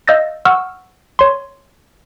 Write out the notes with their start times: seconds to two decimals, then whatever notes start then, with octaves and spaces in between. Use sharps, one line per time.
0.08 D#5 F5 E6 G6 A6 A#6
0.45 F#5 C#6 E6 F6
1.19 C#5 C6